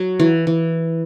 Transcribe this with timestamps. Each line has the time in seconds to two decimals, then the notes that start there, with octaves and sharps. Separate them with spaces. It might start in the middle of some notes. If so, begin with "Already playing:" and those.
Already playing: F#3
0.20 E3
0.47 E3